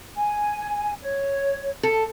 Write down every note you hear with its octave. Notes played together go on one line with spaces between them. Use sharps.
G#5
C#5
A4